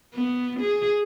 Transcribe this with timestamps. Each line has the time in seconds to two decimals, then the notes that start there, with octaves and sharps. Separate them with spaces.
0.14 B3
0.60 G#4